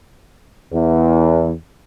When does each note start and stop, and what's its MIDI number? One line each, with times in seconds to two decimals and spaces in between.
0.72 1.53 40